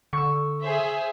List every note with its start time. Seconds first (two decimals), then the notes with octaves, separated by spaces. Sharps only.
0.13 D3 C#6 E6
0.62 G#4 C5 E5